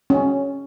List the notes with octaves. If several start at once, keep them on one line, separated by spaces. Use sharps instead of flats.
C#4